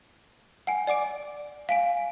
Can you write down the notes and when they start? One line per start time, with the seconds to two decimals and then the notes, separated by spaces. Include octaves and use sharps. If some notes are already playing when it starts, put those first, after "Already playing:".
0.67 F#5 G#5
0.87 D5 F#5 D6 D7
1.69 F5 G#5 D7